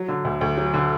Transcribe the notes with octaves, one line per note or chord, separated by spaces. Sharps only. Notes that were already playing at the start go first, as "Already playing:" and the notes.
Already playing: F#3
D3
D2
D2
F#3
D3